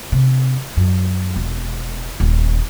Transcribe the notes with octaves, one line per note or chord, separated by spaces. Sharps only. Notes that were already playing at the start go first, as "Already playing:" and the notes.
C3
F#2
E1
D#1